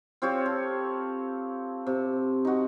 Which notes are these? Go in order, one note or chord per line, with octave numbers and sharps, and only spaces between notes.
C4 F4 G4 C#5
A4
C3
D#4 F#4